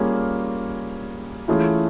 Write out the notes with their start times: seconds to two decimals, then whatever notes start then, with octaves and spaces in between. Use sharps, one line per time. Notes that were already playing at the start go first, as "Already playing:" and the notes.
Already playing: G3 A#3 C#4 F4 G#4
1.48 E3 A3 C#4 F4 G#4